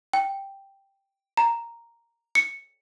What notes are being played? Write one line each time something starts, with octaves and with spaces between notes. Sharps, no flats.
G5
A#5
C#7